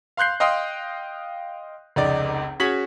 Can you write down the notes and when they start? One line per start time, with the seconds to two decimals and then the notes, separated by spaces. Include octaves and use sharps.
0.17 F5 C6 F#6 G6 C7
0.40 D#5 F5 G5 C6 D#6
1.96 F1 C#2 D#4 D5
2.60 C#4 F#4 G#4 B6 F#7